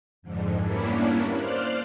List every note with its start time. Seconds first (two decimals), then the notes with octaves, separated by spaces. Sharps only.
0.22 F2 G#2 D3
0.62 G3 A#3 B3 C#4 D4 E4
1.35 C5 D5 F5 F6 F#6